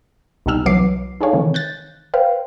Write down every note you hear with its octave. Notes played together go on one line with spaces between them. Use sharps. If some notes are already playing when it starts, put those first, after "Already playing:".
C2 B2 D#4 G4 E6 F6
C2 E3 F#3 B4 D6 C7
D#4 G#4 A4 C#5 F5
C3 D#3 E3
F#6 G6 A6
B4 C5 F5 G5